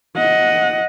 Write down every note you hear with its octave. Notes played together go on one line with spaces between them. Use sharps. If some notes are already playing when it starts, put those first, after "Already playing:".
D#5 F#5